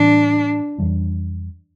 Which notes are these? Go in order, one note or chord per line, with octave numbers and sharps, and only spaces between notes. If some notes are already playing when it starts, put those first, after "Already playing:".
Already playing: A2 E3 G3 C4 D4
F2 E3 G3 D4